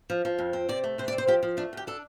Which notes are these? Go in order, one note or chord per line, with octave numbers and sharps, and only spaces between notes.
F3
F3
F2
C4
C3 D5
A3
C3 C5
D5
C4
C5
F3 G4
F3
A3 D4
D2 G4
D4 A4